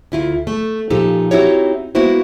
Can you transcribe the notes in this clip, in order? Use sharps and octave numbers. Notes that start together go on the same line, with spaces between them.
D2 E4 F4
A3
A#2 F3 D#4 G4 A4
C4 D#4 E4 F#4 G4 C#5
G#3 A#3 B3 E4 F#4 C5